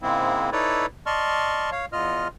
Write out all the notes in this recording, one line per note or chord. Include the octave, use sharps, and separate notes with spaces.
G#2 C#3 G#3 A#3 C4 E4
D#4 E4 A4 B4 C#5 D5
D5 D#5 A5 C6 C#6 F6
C#5 F5
E2 F4 D#5 F6